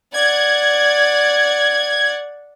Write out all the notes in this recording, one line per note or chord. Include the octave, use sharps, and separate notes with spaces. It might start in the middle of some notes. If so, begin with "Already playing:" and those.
D5 F#5 G#6